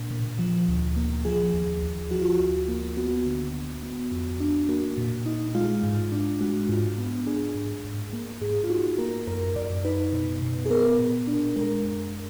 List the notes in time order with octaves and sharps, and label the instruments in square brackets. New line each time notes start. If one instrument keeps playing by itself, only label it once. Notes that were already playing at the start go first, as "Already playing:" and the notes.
Already playing: [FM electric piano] A#2 D4
A#2
F3
D2
A#3
F3 G#4
D#2
D#2
F3 F#4
F4
F#4
D2
A#3
B3 F#4
D3
D3
B3
F2
D4
A#3 F#4
A#2
D#4
G#3 F4
G#2
D4
G#3 F#4
G#2 F4
B3
D4 G#4
G#2
G#2
A#3
G#2 G#4
F4
D#4 F#4
A#3 A#4
F#2 A#4
F#2 D5
D#4 B4
B2
B2
G#4
B3 A#4
A#2
D4
G#3 A#4
F#2